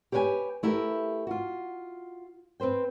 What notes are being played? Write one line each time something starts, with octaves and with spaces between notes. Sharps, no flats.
G4 B4 C#5 F#5 G#5
A3 E4 G4 A#4 B4
F4 F#4
C4 B4 C5 G5